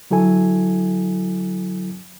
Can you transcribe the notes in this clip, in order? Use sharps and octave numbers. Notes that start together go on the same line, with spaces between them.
D3 F#3 E4 A4 G#5